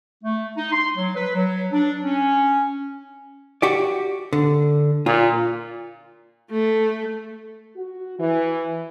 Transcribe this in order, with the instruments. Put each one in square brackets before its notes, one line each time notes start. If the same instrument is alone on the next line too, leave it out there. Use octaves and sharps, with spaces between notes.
[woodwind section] A3
D#4
C6
F#3
B4
F#3
D4
C#4
[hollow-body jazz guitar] F#4 G4 D5
D3
[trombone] A#2 [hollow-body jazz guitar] F4
[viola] A3
[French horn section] F#4
E3